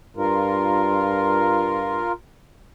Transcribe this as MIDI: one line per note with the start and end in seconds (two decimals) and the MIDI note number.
0.17 2.08 43
0.17 2.12 65
0.17 2.12 70